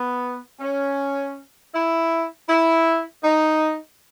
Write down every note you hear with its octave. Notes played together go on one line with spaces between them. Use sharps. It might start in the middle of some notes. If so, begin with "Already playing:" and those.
Already playing: B3
C#4
E4
E4
D#4